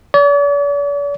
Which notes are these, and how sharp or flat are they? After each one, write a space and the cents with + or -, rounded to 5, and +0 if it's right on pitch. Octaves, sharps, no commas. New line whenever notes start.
D5 -45